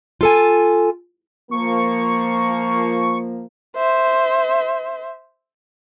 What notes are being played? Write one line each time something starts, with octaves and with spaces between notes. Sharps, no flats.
F4 A4 G#5
F3 A#3 C#6
C5 E5